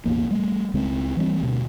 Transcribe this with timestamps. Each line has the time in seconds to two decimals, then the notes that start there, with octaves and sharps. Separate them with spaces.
0.05 E1 A1 E2 A#3
0.31 G3 A3
0.74 C#2 C#3 G#3 C4
1.17 E3 G3 C4
1.40 D2 B2